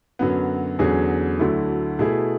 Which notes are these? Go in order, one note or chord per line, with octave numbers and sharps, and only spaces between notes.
F#2 D3 F#3 B3
E2 D3 F#3 C#4 G#4
D2 D3 F#3 A3 E4
B2 A3 E4 G#4